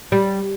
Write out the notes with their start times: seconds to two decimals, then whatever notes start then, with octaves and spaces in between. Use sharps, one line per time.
0.12 G3